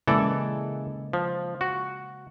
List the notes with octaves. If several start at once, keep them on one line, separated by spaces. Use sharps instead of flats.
C#3 E3 G#3 A#3 A4 D5
F3
F#4